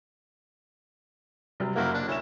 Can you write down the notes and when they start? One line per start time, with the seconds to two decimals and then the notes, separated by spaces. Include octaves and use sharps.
1.60 C3 F#3 G3
1.76 F#1 A#3 E4 F#4 A#4
1.94 D4
2.08 D2 E4 C#5 E7